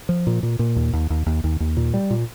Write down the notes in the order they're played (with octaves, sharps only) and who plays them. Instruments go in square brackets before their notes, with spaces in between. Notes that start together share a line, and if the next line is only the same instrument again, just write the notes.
[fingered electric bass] F3
A#2
A#2
A#2
D#2
D#2
D#2
D#2
D#2
D#2
A#2
G3
A#2